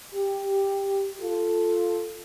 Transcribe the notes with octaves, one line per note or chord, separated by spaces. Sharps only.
G4
F4 A4